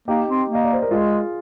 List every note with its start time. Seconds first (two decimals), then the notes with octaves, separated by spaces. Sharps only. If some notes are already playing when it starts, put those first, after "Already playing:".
0.08 A#3 D#4 G4
0.28 C4
0.50 A#3
0.55 D#5
0.64 D5
0.73 C5
0.82 A#4
0.91 G#3 F4 G#4